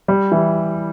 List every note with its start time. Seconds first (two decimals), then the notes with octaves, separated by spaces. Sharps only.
0.08 G3
0.32 E3